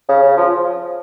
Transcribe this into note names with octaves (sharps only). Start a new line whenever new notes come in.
C#3
C#3
F3